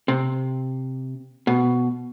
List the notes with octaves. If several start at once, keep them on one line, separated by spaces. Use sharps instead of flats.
C3
B2